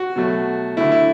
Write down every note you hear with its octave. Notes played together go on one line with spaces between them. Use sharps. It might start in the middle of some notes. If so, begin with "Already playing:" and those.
Already playing: F#4
B2 F#3 A3
D3 A3 E4
E4